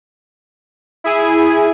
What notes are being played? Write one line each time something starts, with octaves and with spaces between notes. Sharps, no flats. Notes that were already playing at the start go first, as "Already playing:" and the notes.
E4 G#4 G#5